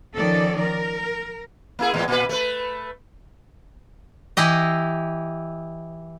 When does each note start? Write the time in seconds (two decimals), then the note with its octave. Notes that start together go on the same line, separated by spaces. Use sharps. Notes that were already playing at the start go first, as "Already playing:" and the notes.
0.15 D#3 F3 C#4 A4 D5
0.61 A#4
1.79 A#3 E4 G#4
1.94 E2 A2 G#3
2.08 A#2 B4
2.29 A3 B4
4.37 E3 E4 G4 D#5